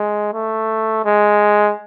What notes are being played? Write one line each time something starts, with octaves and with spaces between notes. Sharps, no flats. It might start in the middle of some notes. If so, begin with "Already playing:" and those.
Already playing: G#3
A3
G#3